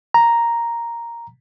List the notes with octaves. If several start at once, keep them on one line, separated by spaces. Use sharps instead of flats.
A#5